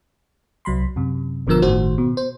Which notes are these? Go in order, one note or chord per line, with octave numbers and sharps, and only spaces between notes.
C2 F#3 B5 C6
F#2 C3
G#1 B2 D3 F3 A#4 E6
G1 A2 D#3 F#4 C5
B2
C5